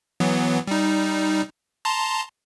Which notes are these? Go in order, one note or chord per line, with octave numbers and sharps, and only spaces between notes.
E3 F#3 B3
G3 D#4
A5 A#5 C6